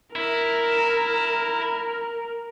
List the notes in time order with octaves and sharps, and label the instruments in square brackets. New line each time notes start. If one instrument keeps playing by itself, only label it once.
[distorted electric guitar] E4 [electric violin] A#4